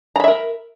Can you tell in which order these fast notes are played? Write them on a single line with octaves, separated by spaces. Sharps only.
A#5 B5 E5 A#4